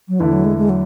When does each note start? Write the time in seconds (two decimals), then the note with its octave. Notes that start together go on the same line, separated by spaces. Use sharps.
0.08 F#3
0.20 E2 D3 E3 A3 E4
0.32 F#3
0.44 G#3
0.57 G#3
0.69 F#3